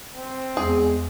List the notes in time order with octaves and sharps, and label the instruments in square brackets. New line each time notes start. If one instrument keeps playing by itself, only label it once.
[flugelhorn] C4
[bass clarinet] E2 [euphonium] G#3 [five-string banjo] G#4